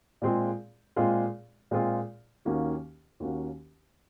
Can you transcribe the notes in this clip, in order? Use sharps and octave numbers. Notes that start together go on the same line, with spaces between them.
A#2 G#3 C4 F4 G#4
A#2 G#3 C4 F4 G#4
A#2 G#3 C4 F4 G#4
D#2 D#3 A#3 C#4 F#4
D#2 D#3 A#3 C#4 F#4